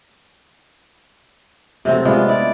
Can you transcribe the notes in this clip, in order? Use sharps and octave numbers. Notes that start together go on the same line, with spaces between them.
C3 F#3 A3 C4
G#3 B3 D4 F4
E4 D5